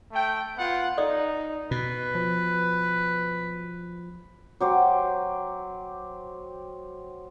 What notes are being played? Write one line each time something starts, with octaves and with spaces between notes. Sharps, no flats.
A3 G5
B3 F4 F#5
D#4 A4 D5 D#6
B2 B4
F3
F#3 G4 C5